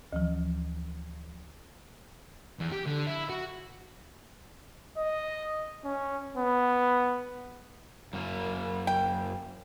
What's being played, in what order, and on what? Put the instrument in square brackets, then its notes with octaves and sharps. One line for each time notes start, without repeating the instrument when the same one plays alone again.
[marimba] D2 E3 F3
[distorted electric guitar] E2
G4
D3
E4
F#4
[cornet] D#5
C#4
B3
[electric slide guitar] F#2 A#3
[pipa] G5